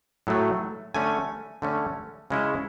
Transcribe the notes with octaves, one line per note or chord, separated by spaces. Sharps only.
A2 F#3 A3
D3 A3 C#4 G#5
D3 A3 C#4
C#3 G#3 C#4 E4